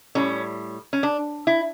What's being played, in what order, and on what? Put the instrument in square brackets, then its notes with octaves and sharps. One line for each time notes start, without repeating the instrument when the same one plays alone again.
[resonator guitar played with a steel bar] A2 G3 C#4
C#4
D4
E4